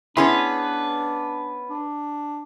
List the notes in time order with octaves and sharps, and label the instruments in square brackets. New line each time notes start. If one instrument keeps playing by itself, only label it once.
[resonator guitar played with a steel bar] B3 C#4 G#4 [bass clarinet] D4 [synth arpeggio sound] E4 C6 [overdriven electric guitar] B4
[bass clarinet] D4